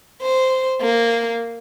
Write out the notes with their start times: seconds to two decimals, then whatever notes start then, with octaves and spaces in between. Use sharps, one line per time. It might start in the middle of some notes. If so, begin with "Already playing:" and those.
0.22 C5
0.81 A#3